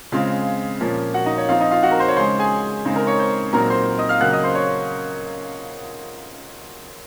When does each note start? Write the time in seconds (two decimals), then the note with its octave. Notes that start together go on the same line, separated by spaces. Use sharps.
0.12 C#3 G#3 C4 F4 F5
0.81 A#2 F3 A#3 C#4
1.14 F#4 F#5
1.26 D#4 D#5
1.38 C#5
1.49 F3 C4 D#4 F4 F5
1.61 D#4 D#5
1.71 F4 F5
1.83 F#4 F#5
1.91 A#4 A#5
2.00 C5 C6
2.08 C#5 C#6
2.16 C#3 G#3 C#4 C5 C6
2.39 G#4 G#5
2.85 C#3 G#3 C4 D#4
2.96 A#4 A#5
3.07 C#5 C#6
3.19 C5 C6
3.53 A#2 F#3 C4 D#4 A#4 A#5
3.70 C5 C6
3.98 D#5 D#6
4.09 F5 F6
4.21 C#3 F#3 A#3 F#5 F#6
4.33 D#5 D#6
4.44 C5 C6
4.55 C#5 C#6